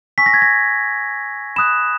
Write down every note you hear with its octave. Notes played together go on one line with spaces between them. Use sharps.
G#5 C#6 E6 B6
A#6
G#6
A#6
B5 D#6 F#6 E7